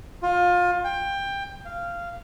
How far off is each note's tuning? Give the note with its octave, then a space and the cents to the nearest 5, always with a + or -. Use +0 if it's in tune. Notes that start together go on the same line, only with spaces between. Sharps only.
F4 +25
G5 +20
F5 -15